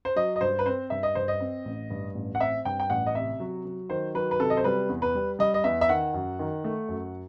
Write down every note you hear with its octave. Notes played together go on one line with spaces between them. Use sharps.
C5
F#3 D#5
D#5
G2 C5
B4
C4 C5
G2 E5
D#5
G2 C5
D#5
C4
A1
G2
A1
F#5
C4 E5
G2 G5
G5
A1 F#5
D#5
C3 E5
F#3
F#3
D#3 C5
F#3 B4
B4
C3 A4
D#5
C5
G3 B4
E2
B4
G3
G3 D#5
D#5
E2 E5
E5
D#3 F#5
F#2
D#3
A3
F#2